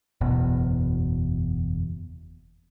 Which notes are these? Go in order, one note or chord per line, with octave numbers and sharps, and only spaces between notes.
F#1 E2 B2